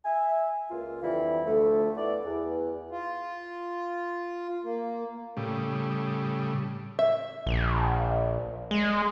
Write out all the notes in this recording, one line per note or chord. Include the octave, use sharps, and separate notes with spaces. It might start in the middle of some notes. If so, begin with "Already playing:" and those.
E5 G#5
C#2 A#3 F4
F2 D3 E3 G3 E4
D2 F3 A3
B3 E4 D5
E2
F4
A#3
A2 C#3 G3
E5
A#1
G#3